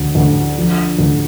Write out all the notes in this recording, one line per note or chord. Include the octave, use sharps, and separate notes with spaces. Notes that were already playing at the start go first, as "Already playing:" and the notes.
Already playing: D2
D2
F3
D2